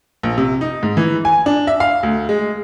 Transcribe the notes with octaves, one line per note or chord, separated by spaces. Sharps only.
A#1
C3
D#4
G#2
E3
G#5
D4
E5
F5
D2
G#3